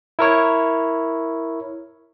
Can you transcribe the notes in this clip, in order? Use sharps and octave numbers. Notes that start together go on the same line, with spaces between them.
E4 A#4 C#5